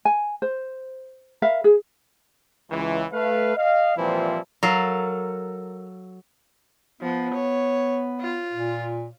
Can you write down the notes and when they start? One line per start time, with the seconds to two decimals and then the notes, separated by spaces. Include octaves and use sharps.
0.05 G#5
0.42 C5
1.42 A#4 E5 F5 B5
1.64 G#4
2.71 C#2 E3
3.13 A3 B4 F5
3.57 D#5 F5
3.96 A#2 E3 F3 G3 C4 E4
4.63 F#3 A4 A#4 F5
7.01 F3 B3
7.34 C#5
8.21 F4
8.52 A#2